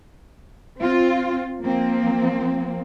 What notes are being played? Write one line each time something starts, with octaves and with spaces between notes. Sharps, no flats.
C4 F4
F3 A#3 C4